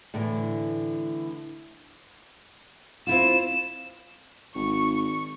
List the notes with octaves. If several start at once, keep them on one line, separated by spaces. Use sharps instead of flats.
A2 D3 E3
C4 E4 F4 E7
G#1 C#6